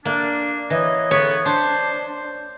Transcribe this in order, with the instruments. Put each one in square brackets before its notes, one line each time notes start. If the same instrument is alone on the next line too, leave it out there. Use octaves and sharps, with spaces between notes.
[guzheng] A#3 [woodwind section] D4
[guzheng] E3 [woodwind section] B4 C#5 D#5
[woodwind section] C#2 D3 B3 [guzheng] C#5
[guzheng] D4 [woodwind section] C5